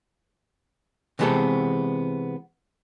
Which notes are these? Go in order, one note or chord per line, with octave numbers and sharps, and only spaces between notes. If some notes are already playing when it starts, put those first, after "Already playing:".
C3 E3 G#3 B3 C4 A4